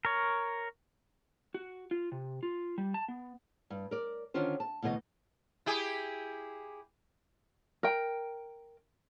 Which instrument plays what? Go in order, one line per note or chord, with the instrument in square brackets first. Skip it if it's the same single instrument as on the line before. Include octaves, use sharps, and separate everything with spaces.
[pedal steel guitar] A#4 C#5
[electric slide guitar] F#4
F4
C3
F4
G3
A5
B3
[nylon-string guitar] G2
A#4 D5
D3 D#3 C#4 D4 F4 C5
A5
D2 B2 E3 A#4 D#5
[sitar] E4 G4 G#4
[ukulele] A#4 G5